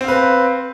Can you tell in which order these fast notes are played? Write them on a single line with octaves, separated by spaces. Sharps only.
C4 F5 B4